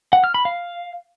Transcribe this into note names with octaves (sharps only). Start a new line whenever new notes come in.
F#5
F6
B5
F5